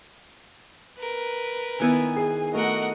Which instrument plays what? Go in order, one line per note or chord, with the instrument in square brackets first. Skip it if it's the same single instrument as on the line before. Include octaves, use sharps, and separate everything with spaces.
[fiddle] A#4 B4
[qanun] D#3 B3 E4 [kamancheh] G#5
[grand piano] G#4
[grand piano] A3 [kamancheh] F#4 D#5 [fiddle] A#4 F#5